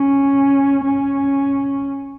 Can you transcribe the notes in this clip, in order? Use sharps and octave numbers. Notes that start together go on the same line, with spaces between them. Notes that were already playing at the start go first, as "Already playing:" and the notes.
Already playing: C#4
C#4